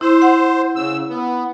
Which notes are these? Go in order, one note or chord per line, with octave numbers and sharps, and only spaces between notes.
E4 C5
F#5
C#3 E6
B3